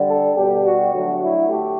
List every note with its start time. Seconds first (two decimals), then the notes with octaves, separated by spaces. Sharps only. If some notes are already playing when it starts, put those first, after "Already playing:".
Already playing: D3 G3
0.08 A4
0.36 B2 G3 G4
0.64 F#4
0.93 D3 F#3 A3
1.21 E4
1.49 A3 G4